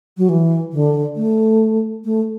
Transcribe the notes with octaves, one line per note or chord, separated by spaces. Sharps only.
F#3
E3
D3
A3
A3